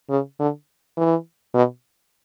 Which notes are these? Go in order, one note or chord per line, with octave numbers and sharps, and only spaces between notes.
C#3
D3
E3
B2